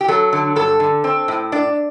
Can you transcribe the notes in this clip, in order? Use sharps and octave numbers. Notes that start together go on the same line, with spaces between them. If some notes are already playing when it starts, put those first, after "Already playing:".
G4
F#3 A4
D3
G2 A4
D3
C4
A2
D4 D5